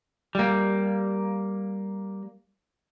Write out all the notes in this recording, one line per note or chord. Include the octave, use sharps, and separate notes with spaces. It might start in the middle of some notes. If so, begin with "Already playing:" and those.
G3 A#3